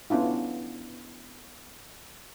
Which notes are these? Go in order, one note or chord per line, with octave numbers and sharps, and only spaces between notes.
B3 C#4 D4 E4 F4